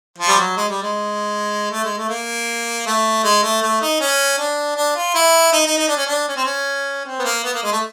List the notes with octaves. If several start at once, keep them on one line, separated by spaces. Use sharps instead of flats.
F3
G3
F#3
G#3
G3
G#3
A3
G#3
A3
A#3
A3
G#3
A3
A3
D#4
C#4
D4
D4
F4
E4
D#4
D#4
D#4
D4
C#4
D4
C#4
C4
C#4
C4
B3
A#3
B3
A#3
G#3
A3